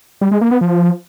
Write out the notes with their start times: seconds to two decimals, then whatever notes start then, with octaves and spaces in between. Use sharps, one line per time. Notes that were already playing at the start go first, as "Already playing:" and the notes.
0.21 G3
0.31 G#3
0.41 A#3
0.51 B3
0.61 F3